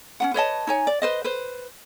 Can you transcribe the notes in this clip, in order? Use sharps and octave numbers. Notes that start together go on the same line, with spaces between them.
C#4 D4 F#5
B4 C#5 D#5 A5
D#4 C#5 G#5
D5
B4 C5 D#5
B4 C5